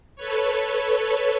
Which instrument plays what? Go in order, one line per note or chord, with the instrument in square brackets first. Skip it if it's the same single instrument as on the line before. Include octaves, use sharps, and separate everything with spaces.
[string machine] A4 B4 C#5